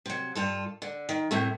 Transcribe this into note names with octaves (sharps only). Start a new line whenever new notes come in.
C3 F#3
G2 F4 A4
D3
D#3
A2 C3 A3